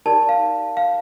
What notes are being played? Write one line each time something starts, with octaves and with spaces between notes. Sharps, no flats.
D#4 G4 A#4 D5 A5
F5
F5